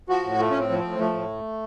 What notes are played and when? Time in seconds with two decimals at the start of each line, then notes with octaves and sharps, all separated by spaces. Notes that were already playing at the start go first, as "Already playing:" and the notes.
0.09 F3 F#4
0.24 A2
0.39 F3 A3
0.51 A2 C#4
0.59 C4
0.69 F3
0.79 C4
0.84 A2
0.99 F3 A3
1.14 A2